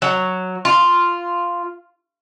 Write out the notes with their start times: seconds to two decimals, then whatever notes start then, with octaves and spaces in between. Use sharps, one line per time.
0.02 F#3
0.65 F4